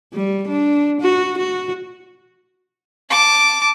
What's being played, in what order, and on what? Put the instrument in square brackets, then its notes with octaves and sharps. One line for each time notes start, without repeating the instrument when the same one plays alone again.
[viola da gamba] G3
D4
F#4
F#4
[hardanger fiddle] A5 D6